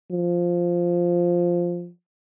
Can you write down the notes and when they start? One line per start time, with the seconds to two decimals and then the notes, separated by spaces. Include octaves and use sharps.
0.11 F3